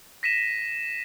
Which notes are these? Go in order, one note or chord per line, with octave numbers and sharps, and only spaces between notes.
A#6 B6 D#7 E7